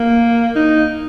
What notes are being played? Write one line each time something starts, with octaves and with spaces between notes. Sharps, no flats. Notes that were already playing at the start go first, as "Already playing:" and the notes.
Already playing: A#3
D#4